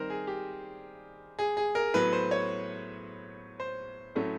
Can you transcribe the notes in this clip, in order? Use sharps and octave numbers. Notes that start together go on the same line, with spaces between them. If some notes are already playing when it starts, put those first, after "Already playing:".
Already playing: D#3 G3 C4 A#4 C5
G#4
G4
G#4
G#4
A#4
A2 F#3 B3 B4
C5
C#5
C5
A2 F#3 A3 C#4